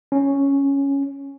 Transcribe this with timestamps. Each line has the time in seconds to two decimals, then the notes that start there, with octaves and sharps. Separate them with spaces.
0.12 C#4